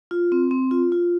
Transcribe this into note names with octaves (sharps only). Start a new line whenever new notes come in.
F4
C4
C4
F4
F4